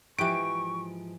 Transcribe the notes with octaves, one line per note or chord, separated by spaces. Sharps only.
G#2 E3 F3 G4 B4 C#6 D7